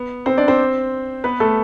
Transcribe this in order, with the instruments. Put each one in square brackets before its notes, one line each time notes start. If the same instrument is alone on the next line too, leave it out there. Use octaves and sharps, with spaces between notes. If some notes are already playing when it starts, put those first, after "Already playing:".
Already playing: [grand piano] B3
C4 C5
D4 D5
C4 C5
B3 B4
A3 A4